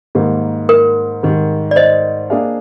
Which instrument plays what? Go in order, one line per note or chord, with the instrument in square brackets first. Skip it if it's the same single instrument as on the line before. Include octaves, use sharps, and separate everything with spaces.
[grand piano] G#2 D#3 G3 A#3
[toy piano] A#4
[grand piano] G#2 D#3 G3
[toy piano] D5
C5 D#5
[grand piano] A#3 D4 G#4 D5 F5